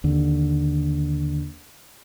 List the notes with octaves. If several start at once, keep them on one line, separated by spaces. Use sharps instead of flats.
D#2 D3